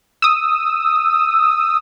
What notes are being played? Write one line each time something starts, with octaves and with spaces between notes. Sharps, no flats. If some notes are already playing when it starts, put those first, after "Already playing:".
D#6 E6